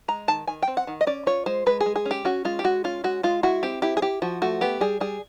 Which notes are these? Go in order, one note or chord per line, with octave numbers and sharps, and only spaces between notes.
G#3 A#5
D#3 A5
D#3 G#5
G5
C4
F#5
D#3
D#5
C#4 D5
F4 C#5
G#3 C5
G#3 B4
G#4
G#3
G#4
C#4
G4
C#4 F#4
G#3 F4
G4
G#3 F#4
C#4 F4
G#3 F#4
G#3 F4
E4 F#4
C4 G4
E4 G4
G#4
E4 G4
F3 F#4
A3 F#4
B3 G4
G3 G#4
G3 G#4